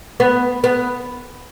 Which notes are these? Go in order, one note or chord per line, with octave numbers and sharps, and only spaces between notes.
B3
B3